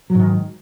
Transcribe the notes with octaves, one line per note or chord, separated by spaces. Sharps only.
G#2 D#3 F#3